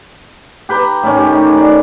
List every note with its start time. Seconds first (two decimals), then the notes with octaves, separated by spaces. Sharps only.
0.69 G4 B4 G5 A#5
1.03 A2 D#3 C#4
1.17 G4
1.32 D#4
1.57 D5